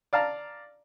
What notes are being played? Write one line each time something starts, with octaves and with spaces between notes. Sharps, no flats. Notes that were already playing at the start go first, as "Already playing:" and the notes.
D5 F5 A5 A#5